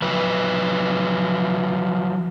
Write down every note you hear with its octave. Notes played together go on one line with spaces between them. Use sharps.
F3 F#3 B4